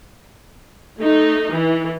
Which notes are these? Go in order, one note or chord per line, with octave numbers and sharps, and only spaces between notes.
A3 D#4
E3